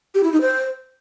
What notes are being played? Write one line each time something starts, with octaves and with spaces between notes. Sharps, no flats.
G4
E4
D#4
C5